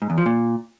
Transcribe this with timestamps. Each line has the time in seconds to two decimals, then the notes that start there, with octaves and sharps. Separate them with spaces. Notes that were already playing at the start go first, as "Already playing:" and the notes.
0.02 G#2
0.10 E2
0.18 F3
0.26 A#2